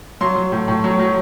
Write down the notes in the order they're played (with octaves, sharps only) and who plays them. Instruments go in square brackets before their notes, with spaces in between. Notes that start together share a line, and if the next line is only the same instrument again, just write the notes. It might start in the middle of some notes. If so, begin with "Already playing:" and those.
[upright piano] F#3 C6
F#3
A2
A2
F#3
F#3